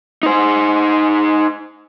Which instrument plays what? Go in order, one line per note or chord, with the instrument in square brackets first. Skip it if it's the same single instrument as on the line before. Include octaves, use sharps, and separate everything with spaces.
[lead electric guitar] D#4 C5